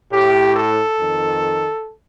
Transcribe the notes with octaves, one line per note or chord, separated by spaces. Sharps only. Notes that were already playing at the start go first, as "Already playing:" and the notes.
A2 G4
A4
F2 D#3